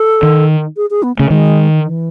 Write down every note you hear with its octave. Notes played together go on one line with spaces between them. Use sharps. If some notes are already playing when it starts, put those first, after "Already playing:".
Already playing: A4
D#3
G#4
G#4
B3
C#3 A3
D#3 G#3
E3